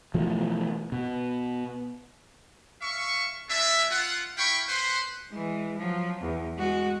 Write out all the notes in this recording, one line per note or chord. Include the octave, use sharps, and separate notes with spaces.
B2 E3 F3 A3
B2
E5 F5 C#6
G#3 D4 E5
F4 F#5
E4 F5 G5 B5 C#6
B4 C5 F#5 C6
E3 G#3
F3 F#3
E2
G#3 F#4